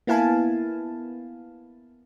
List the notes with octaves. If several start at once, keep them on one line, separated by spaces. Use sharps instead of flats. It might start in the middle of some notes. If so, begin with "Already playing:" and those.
A#3 B3 E4 F5 G#5 A5